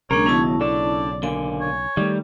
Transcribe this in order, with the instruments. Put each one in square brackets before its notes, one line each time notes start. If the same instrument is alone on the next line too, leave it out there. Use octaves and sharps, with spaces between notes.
[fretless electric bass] B1 C#3 [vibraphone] G#3 A#3 D4 [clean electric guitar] A#4 [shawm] C#5
[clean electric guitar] D#2 B2 [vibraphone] C#4 E4 A5
[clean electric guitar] D4 A4 [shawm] D5
[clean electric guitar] D3 A#3 [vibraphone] G#5
[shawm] C#5
[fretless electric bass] D#3 A3 [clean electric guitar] G3